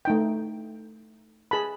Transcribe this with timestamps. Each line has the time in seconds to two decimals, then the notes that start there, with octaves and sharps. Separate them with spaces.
0.05 A3 D#4 G5
1.51 G#4 A5 B5